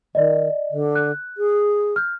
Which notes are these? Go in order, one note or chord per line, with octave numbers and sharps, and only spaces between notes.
D#3 D5 D#5
D3
F#6
G#4
F6 G6